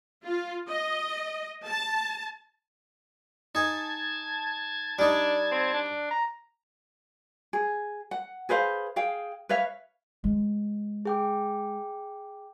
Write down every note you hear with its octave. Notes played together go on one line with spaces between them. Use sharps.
F4
D#5
A5
D#4 G#4 A5 G#6
G3 D4 D#4
C4
D4
A#5
G#4
F#5
G#4 B4 C5 F5
G#4 F5 G5
B4 C#5 E5 F5
G#3
G#4 G5 D6